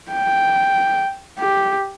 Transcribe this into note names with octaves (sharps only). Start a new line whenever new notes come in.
G5
G4